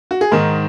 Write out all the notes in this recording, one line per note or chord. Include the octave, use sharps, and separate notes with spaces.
F#4
G#4
G#2 D#3 A#4